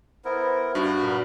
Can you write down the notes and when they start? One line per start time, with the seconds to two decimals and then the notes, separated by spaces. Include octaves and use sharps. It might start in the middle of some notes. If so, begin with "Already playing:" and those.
0.25 B3 E4 A#4 C5
0.75 G2 D4 F#4
1.03 A#2 B3 A#4 B5